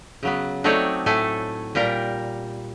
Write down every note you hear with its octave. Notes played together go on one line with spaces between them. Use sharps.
C#3 F#3 B3
F#3 A3 C4 D#4 C#5 D5
A2 A3 A4 G#5
A#2 G3 A#4 G5